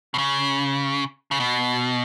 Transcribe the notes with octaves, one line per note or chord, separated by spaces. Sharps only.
B2
C#3
C#3
B2